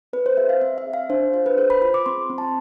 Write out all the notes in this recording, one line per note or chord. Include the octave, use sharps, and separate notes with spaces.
C4 B4
C5
G#4 E5
F5
C4 E5
E5
G#4
F5
D4 C5
F4 C5
B4
G#4 C5
B5
F4 B5
D6
C4 C6
C4
A5